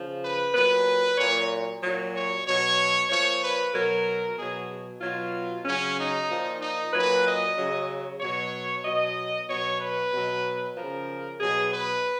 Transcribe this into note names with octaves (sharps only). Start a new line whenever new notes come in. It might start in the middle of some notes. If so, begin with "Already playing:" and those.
Already playing: C#3 F3
B4
A#2 F#3 B4
A#2 F#3 C#5
A#2 F#3
C#5
B2 F#3 C#5
A#2 F3 C#5
B4
B2 F#3 A#4
B2 F#3 G#4
B2 F#3 F4
C#3 F#3 C#4
D#4
A#2 F3
D#4
A#2 F#3 B4
D#5
C#3 F#3
B2 F#3 C#5
B2 F#3 D#5
B2 F#3 C#5
B4
B2 F#3
C#3 F3 A#4
B2 F#3 G#4
B4